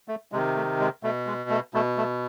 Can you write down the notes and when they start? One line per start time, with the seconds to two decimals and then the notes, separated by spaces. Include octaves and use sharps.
0.08 A3
0.32 C3 D#3 G#3
0.56 A3
0.80 G#3
1.03 B2 A3
1.27 G#3
1.50 A3
1.74 B2 A3
1.97 A3